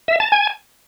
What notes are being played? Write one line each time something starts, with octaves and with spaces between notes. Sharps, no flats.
E5
A5
G#5